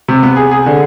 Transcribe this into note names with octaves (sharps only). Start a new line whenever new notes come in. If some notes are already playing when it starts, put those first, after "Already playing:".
C3
B3
G#4
G#4
D3